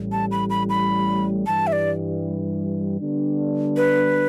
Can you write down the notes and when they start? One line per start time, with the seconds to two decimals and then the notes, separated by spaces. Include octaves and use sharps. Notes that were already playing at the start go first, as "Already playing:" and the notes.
Already playing: A1 A2 G3
0.12 A5
0.31 B5
0.50 B5
0.70 B5
1.46 G2 E3 G3 A5
1.67 E5
1.72 D5
3.00 D3 G3 B3 D4
3.77 B4